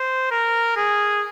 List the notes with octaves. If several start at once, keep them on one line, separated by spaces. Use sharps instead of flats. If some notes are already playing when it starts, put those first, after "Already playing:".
Already playing: C5
A#4
G#4